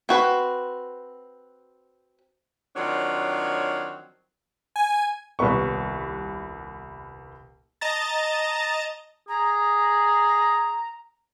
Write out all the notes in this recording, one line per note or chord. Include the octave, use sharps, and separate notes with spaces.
C4 F#4 B4
D#3 F3 F#3 C4 D4 C#5
G#5
D#1 C2 B3 B4 C#6
D#5 A5 A#5 A6
G#4 A#5